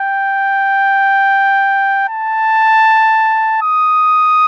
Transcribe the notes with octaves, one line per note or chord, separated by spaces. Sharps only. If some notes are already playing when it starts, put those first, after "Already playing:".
Already playing: G5
A5
D#6